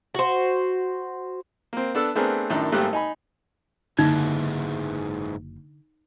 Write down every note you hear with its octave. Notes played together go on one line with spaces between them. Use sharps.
F#4 C5
A#3 C4
B3 D4 A4 E6
A3 B3 C4 D4 G#4 A#4
F#2 A2 D#3 D4
G#1 G3 A3 A#3 G4 F#6
D#4 G#5 B5
F#1 G#2 D3 E3 D#4